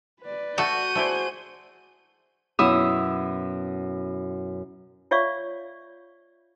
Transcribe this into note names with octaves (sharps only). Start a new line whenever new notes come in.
B4 D5
A3 F#4 A4 G6 D#7
A3 E4 G#4 C5 D5
F#2 B2 E4 D#6 E6
F4 C#5 D5 E5 F5 C#6